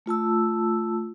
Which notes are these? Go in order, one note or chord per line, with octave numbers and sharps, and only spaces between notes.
A3 F4 A5 E6